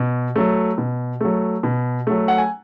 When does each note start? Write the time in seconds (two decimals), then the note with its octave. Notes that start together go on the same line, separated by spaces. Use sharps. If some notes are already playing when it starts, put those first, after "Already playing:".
Already playing: B2
0.36 F#3 A3
0.78 B2
1.21 F#3 A3
1.63 B2
2.07 F#3 A3
2.28 F#5
2.38 G#5